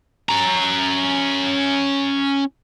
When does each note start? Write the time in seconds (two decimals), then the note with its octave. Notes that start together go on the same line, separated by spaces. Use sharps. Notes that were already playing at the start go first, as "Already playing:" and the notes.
0.29 C#4 A#5